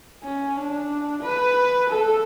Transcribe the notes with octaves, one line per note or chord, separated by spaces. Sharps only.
C#4
D4
B4
A4